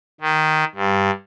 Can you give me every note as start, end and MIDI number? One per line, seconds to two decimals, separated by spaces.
0.21 0.64 51
0.75 1.10 43